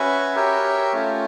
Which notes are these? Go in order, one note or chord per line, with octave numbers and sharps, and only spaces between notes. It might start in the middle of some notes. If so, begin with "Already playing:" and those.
Already playing: C#4 F#4 B4 E5 G#5
G4 A#4 C#5 E5 G5
A3 C#4 F4